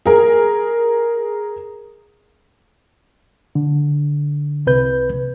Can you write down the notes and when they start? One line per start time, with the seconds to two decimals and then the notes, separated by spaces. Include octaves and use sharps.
0.06 G#4 A#4
3.55 D3
4.67 C2 C3 B4 G6